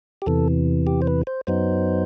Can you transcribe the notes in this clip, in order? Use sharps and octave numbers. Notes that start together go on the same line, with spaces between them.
G4
E2 C3 E3 A4
G4
C5
B4
C5
F#2 F#3 B3 D#4 C5